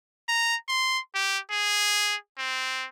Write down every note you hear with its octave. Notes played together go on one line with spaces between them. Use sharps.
A#5
C6
G4
G#4
C4